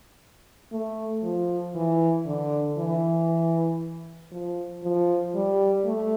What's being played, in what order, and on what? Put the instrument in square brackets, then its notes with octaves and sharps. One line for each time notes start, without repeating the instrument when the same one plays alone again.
[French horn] A3
F3
E3
D3
E3
F3
F3
G3
A3